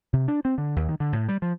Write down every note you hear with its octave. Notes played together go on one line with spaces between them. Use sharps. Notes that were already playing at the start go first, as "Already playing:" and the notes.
C3
D4
C4
D3
D#2
D#3
D3
A2
G3
F3